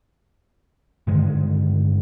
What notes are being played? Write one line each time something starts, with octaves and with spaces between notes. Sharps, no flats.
G2 D3 D#3 G#3